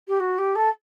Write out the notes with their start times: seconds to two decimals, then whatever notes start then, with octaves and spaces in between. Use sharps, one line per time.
0.08 G4
0.19 F#4
0.38 G4
0.55 A4